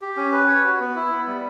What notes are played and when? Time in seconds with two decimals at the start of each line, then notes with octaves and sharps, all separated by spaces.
0.01 G4
0.17 C#4
0.32 B4
0.48 C#5
0.64 F#4
0.80 B3
0.96 E4
1.11 B3
1.27 G3